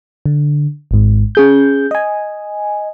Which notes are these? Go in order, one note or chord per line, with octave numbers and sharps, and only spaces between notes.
D3
G#1 G#2
C#4 G#4 G6
D#5 G#5